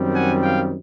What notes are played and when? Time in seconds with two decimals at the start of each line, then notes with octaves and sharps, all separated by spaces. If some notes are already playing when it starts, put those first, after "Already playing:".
Already playing: F#2 D#3 G3 C4
0.14 F#5 G#5
0.42 F5 G5